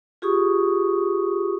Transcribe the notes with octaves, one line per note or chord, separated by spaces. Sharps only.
F4 G4 G#4 C#6 D#6